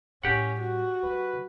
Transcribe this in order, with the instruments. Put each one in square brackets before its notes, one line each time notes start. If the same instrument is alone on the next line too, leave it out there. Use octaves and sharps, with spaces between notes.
[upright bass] A2 G3 [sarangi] C#4 [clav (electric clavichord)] G4 F#5
[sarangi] F#4
[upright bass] F#3 [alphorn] B4